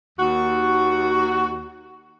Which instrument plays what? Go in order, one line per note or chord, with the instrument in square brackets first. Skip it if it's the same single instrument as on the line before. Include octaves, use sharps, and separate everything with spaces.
[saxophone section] D#2 F#4